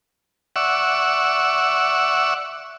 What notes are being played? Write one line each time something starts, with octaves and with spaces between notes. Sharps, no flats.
D5 E5 F#5 C#6 E6